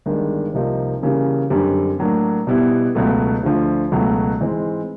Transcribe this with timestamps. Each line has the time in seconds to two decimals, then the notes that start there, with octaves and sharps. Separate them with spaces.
0.06 G1 G2 D#3 G#3
0.53 C2 C3 F3 A#3 D#4
1.02 C#3 E3 G3 A#3 C#4
1.50 F#2 D3 G3 C4
1.99 A2 F#3 A#3 D4
2.47 B2 G3 B3 E4
2.95 C#2 B2 F#3 A3
3.43 D2 D3 F3
3.92 C#2 B2 F#3 A3
4.41 G#2 E3 G#3 C4